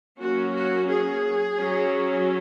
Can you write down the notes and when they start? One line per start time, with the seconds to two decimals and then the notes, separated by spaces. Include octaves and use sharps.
0.18 F#3 A#3 C#4 F#4
0.54 F#4
0.89 G#4
1.60 F#3 C#4